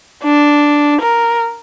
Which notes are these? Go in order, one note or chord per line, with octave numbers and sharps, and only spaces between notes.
D4
A#4